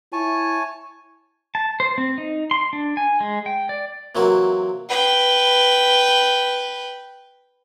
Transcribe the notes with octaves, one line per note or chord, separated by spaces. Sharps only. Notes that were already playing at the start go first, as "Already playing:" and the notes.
E4 C#5 G#5 A5
A5
C5
C4
D#4
C6
D4
G#5
G#3
G5
D5
C3 E3 F#3 A#3 F#4 A#4
B4 G5